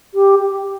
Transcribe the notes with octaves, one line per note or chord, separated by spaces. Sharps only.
G4
G4